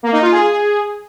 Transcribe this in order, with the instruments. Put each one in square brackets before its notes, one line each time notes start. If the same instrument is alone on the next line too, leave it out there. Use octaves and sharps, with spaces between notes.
[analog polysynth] A#3
D#4
F4
G#4